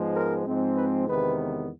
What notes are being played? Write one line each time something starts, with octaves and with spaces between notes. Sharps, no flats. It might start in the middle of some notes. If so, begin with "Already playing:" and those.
Already playing: G#2 F3 G#3 B3
A#4
G#2 F3 G#3 C4
B4
E2 C3 D#3 G#3 B3 B4